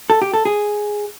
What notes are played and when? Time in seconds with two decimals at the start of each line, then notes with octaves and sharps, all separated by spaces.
0.10 A4
0.22 G4
0.33 A4
0.45 G#4